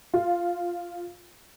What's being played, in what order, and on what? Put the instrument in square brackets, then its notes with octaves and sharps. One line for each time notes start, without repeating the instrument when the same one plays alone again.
[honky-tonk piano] F4